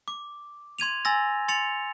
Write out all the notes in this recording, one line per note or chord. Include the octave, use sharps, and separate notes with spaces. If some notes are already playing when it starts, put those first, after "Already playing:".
D6
C6 G#6 D#7 F7
G#5 C6 E6 A6 A#6
C6 A6 C#7 F7